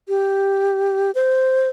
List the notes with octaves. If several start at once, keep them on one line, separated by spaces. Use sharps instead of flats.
G4
C5